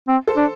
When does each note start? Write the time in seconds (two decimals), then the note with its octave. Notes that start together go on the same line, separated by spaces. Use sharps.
0.08 C4
0.28 A4 C5
0.37 D4